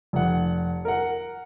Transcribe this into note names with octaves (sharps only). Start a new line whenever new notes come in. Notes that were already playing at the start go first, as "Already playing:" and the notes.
F1 F#5
A#4 F#5